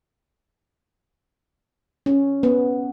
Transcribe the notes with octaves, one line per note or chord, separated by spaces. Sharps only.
C#4
B3